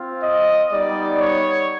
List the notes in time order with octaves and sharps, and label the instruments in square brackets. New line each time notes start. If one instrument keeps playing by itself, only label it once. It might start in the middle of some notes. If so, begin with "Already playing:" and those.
Already playing: [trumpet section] C4 F4
D#5
G3 B3 D#4 D5
C#5